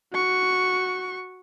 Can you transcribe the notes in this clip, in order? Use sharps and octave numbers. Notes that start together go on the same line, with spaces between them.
F#4 C#6